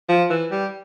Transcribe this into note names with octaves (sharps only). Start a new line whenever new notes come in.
F3
E3
G3